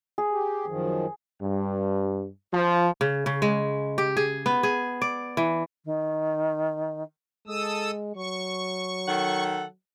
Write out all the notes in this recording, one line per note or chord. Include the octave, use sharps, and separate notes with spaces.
G#4
G4
F#2 D#3 F3
G2
F3
C#3
C#3
G#3
G4
G#4
B3
G#4
D5
E3
D#3
G#3 A4 D#6 E6
F#3 C#6
D#3 A4 F#5